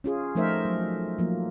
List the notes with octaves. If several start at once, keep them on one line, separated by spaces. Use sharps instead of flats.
C#4 F4 G#4
F3 A3 D#4 A#4 C5 E5
F#3
F3 F#3 A#3